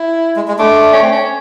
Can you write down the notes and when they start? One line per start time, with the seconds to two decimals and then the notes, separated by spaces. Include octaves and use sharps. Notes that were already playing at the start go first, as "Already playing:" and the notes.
Already playing: E4
0.36 G#3
0.48 G#3
0.59 A3 D4
0.93 C#4
1.03 C4
1.12 C#4